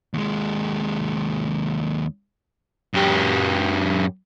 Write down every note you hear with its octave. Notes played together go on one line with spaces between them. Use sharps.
D#2 G#3
F#2 G4